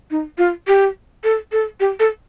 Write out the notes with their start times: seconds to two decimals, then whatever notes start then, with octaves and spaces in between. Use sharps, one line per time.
0.11 D#4
0.38 F4
0.67 G4
1.24 A4
1.52 A4
1.80 G4
2.00 A4